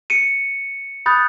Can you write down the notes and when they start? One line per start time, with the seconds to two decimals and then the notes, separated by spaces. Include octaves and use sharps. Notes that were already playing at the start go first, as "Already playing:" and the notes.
0.10 C#7 D#7
1.06 B5 D#6 F#6 G6 A6